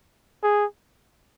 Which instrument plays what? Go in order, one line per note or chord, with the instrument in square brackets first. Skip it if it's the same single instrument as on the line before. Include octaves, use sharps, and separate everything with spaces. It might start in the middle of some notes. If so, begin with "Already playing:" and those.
[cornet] G#4